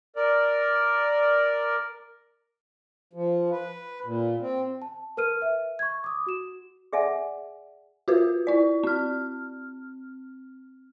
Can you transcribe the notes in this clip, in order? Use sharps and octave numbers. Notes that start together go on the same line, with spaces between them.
A#4 D5
F3
B4
A#2
C4
A5
A#4 B4 F6 D#7
E5
C#6 G#6
D6 D#6
F#4 E7
G#4 D5 E5 F#5 G#5
F4 F#4 A#4 B4
E4 D5
C4 F6